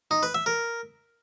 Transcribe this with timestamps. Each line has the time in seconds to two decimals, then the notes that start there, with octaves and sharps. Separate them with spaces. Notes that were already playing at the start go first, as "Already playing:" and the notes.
0.11 D#4
0.23 B4
0.35 E5
0.46 A#4